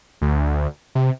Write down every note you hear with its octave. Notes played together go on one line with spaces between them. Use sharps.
D2
C3